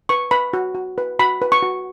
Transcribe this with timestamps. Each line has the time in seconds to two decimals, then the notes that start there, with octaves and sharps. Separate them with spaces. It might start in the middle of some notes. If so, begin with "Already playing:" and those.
0.09 B4 C#6
0.31 B4 B5
0.53 F#4
0.75 F#4
0.98 B4
1.19 F#4 B5
1.42 B4
1.52 C#6
1.63 F#4